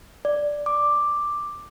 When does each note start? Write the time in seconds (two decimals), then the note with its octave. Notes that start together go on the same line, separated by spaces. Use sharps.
0.25 D5
0.66 D6